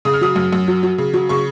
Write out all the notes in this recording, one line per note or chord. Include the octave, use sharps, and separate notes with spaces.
C#3 D#6
F6
F#3 D#6
F#2
F#2
F#3
F#3
C#3
F#3
C#3 C#6